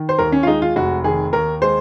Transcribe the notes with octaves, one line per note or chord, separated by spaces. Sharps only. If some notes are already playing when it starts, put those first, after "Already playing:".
Already playing: D#3
C5
D#2 A#4
C#4
F4
G#3 D#4
F4
F1 F#4
D#3 G#4
D#2 A#4
G#3 C5